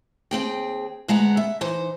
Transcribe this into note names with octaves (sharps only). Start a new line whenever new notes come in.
D#2 C4 G#4 G5
D2 G#3 B3 F#5 A#5
E5
E3 D#4 C5